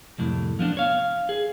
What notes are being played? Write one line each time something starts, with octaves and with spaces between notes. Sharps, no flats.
C2 F2 A2
F3 B3 D4
C#5 F5
G#4